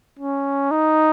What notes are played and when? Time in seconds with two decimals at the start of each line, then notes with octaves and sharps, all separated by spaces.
0.19 C#4
0.71 D#4